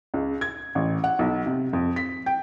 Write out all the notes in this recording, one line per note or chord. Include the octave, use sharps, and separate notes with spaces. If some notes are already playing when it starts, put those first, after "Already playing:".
C#2
G#6
A1
F#5
B1
C3
F2
B6
G5